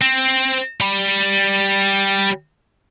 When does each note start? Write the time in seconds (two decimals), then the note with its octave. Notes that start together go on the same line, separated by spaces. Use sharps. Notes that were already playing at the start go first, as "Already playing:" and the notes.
0.02 C4
0.80 G3 B5